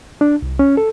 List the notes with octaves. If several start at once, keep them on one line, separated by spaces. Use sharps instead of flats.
D4
C2
C#4
A4